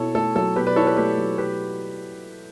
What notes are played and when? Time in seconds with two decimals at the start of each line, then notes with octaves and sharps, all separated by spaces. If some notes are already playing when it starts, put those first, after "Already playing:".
Already playing: B2 E4 A4 C#5
0.15 A3 A4
0.36 F#3 A4
0.56 B2 G4 B4
0.67 B4 D5
0.76 E4 A4 C#5
0.87 G4 B4
0.97 A3 G4 B4
1.18 F#3
1.38 G4 B4